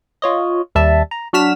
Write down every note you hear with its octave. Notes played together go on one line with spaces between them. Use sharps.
F4 C#5 D#5
D#2 G3 E5 A5
A#5
F#3 D4 F#4 F6 B6 E7